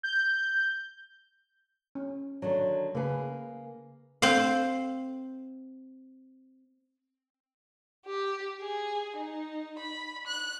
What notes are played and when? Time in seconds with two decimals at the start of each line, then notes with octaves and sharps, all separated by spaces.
0.03 G6
1.95 C#4
2.42 D3 D#3 F#3
2.95 C#3 A#3 G#4 B4
4.22 C4 F5
8.06 G4
8.61 G#4
9.16 D#4
9.79 B5
10.27 F#6